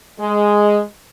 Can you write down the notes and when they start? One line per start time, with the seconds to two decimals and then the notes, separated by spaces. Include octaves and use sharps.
0.19 G#3